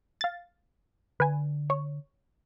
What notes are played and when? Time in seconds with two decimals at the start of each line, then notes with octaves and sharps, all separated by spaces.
0.21 F5 A6
1.20 D3 B4 G#5
1.70 C#5